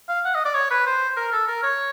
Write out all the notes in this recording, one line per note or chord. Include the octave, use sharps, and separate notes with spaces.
F5
F#5
D#5
D5
C#5
B4
C5
A#4
A4
A#4
C#5